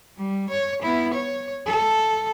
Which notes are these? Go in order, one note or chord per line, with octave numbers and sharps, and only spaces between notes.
G3
C#5
B3 E4
C#5
A4